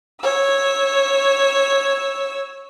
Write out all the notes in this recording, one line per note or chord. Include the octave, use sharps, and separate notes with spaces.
C#5 E6